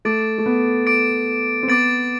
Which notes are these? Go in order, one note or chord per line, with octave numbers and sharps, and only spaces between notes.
A3 D6 A6 D7
A3
B3
D6 A6 D7
C4
B3 D6 A6 D7